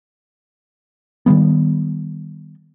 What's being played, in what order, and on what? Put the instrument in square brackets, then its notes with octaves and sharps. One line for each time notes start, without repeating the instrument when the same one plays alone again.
[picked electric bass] D#3 F#3 G3 B3